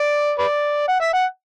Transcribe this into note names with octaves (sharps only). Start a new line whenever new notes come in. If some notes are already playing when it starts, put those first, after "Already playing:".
Already playing: D5
B4 D5
F#5
E5
F#5